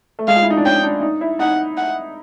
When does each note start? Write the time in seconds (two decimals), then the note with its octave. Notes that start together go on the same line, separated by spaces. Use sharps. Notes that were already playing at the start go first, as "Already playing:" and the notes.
0.19 A3
0.28 G#3 F5
0.36 F4
0.42 E4
0.50 D#4
0.57 D4
0.65 C#4 G5
0.83 D4
1.02 D#4
1.21 E4
1.39 D#4 F#5
1.77 F#5